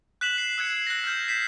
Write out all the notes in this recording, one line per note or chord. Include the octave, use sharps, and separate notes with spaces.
F#6 B6 E7 F#7
C7
E6 F#6 G#6 C#7
F#6 A#6
F6 G6
B6 C7 E7